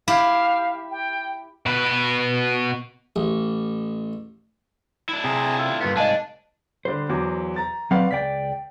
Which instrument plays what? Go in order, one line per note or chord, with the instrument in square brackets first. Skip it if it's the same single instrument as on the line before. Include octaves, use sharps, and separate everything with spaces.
[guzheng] E4 G4 [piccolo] F5
[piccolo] G5
[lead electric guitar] B2 B4
[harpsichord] A1
[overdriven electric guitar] D4 E4
[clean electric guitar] C3 [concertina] G#4 A5 A#5
[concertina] F4 A4 [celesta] E6
[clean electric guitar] G2 A#3 B3
[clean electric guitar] C2 G#2 G#5 [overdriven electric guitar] D4 [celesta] D#5 F5 A5
[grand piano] D3 G3 [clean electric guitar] C5
[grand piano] E2 F#3 D6
A#5 A6
[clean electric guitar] F#3 C4 F#5 [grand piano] B4 D5 F5
[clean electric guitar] C#2 D5 G5 [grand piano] B6